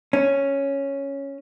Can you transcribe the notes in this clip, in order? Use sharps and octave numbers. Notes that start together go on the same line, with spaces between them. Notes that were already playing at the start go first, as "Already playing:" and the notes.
C#4